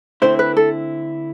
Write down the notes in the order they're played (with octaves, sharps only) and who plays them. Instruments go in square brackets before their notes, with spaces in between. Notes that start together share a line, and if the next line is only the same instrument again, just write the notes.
[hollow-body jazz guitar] D3 A3 C4 E4 [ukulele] C5
[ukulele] B4
A4